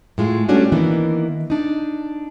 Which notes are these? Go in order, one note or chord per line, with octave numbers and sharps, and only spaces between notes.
A2 G#3 F4
G3 A3 C#4 D4 F#4
D#3 E3 A#3 B3 D4
D4 D#4